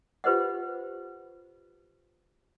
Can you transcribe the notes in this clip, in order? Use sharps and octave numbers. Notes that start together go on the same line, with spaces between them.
F4 G4 B4 C5 D#5 F#5